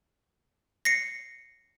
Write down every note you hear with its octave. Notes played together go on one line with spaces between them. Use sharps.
A#6 C7 C#7